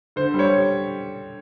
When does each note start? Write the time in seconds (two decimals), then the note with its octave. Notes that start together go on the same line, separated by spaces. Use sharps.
0.16 D3 C5
0.34 G3
0.39 C#5